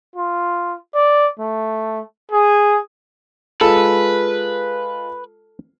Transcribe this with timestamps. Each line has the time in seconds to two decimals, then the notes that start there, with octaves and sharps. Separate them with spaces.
0.16 F4
0.95 D5
1.39 A3
2.32 G#4
3.61 G#3 F4 A4 B4